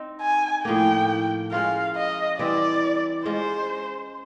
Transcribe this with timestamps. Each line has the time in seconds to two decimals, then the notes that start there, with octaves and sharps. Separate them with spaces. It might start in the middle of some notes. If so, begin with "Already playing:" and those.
Already playing: C4 D#4
0.21 G#5
0.65 A2 F3 A#3 G5
1.52 G#3 C#4 F4 A#4 F5
1.96 D#5
2.39 E3 G3 C4 E4 D5
3.26 G#3 C#4 F4 C5